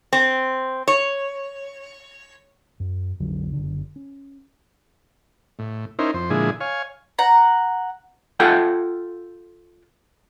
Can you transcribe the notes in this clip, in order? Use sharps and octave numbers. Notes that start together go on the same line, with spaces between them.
C4
C#5
F#2
B1 F2 D3 F#3
F#1 D3
C#4
A2
C#4 D#4 E4 A#4 C5
F2 C5
A#2 D3 F3 G#3 E4 G#4
C#5 F5 G#5
F#5 A#5
F4 A4 F#5 G5